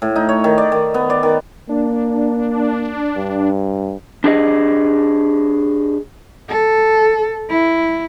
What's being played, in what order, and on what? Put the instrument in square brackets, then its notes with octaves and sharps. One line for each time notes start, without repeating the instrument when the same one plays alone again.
[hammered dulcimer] A2
D#4
C#5
D#3
D5
D#3
B3
D5
D#3
[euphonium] A#3 [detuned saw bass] D4
[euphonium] G2
[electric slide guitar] D4 G4 G#4 D#5
[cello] A4
E4